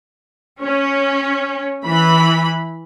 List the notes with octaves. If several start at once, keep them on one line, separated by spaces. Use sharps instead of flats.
C#4
E3 B5